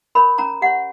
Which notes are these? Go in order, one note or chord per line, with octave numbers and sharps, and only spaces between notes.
A#4 C#5 B5
C#4 A#5
G4 C#5 F#5